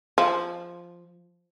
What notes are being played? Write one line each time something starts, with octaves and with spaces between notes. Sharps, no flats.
F3